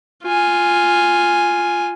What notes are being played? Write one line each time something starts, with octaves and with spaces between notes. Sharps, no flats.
F4 G#5